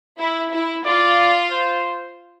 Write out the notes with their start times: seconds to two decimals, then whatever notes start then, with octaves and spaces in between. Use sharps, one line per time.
0.19 E4
0.52 E4
0.85 F4 D5
1.51 C5